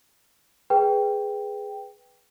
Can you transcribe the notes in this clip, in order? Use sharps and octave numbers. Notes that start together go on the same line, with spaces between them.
G#4 B4 G5